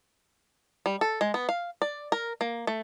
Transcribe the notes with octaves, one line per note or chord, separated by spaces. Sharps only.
G3
A4
G#3
B3
F5
D5
A#4
A#3
A3